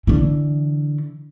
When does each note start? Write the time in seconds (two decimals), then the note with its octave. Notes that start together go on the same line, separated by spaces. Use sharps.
0.07 D3 E3